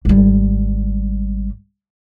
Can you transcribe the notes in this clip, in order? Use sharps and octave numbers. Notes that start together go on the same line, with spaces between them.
G#1 G3